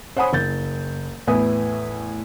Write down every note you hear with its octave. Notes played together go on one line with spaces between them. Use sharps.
C5 C#5 F#5 G#5 B5 D#6
F#1 G6 A6
E2 A2 E4 B4 G#5 D#6